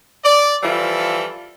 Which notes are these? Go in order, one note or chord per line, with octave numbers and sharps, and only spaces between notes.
D5
E3 F3 G3 F4 A4